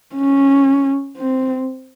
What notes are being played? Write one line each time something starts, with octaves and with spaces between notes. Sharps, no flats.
C#4
C4